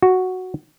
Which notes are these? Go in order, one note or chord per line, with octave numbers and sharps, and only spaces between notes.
F#4